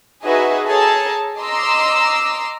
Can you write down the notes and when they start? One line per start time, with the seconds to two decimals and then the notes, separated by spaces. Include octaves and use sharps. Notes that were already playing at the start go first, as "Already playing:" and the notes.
0.24 D#4 F#4 G#4 B4 D#5 E5
0.66 G#4 A4 C#5 A5 A#5
1.40 D#5 A#5 C6 D6 E6